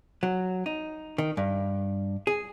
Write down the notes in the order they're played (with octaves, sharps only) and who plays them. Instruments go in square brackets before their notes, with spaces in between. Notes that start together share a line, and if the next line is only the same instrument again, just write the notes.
[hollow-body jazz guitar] F#3
D#4
D#3
G2
G#4